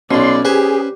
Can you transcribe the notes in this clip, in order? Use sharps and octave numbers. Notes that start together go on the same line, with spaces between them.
B1 B2 C#4 D5 C6
G4 G#4 B4 C5 G#5